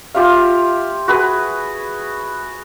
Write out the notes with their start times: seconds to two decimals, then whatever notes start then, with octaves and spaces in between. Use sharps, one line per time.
0.14 F4 G4 E5 F5
1.08 F#4 G#4 B4